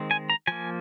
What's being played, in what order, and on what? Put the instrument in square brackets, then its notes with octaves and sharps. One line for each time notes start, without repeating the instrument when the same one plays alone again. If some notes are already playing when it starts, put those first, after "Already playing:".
Already playing: [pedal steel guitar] D#3 G#3 C4
G#5
A#5
F3 A#3 G#5